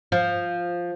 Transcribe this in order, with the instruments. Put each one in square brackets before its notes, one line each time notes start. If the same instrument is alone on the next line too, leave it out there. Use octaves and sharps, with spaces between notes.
[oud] F3